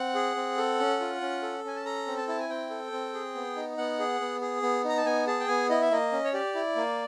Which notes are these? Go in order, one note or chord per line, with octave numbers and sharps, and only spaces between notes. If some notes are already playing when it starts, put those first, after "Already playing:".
Already playing: C4 F#5
G#4
C4
A4
C#4
F4
C#4
A4
C#4 G#5
A5
A4 A#5
C4
A5
E4 A5
G#5
C4 G5
A4
C4
G#4
B3
D#4
B3 F#5
G#4
B3
G#4
B3
D#4
A#5
A5
B3 G#5
G#4 A5
G5
B3 G#5
E4 D#5
E5
A#3 D#5
C#4
C#5
G4 D5
E4
A#3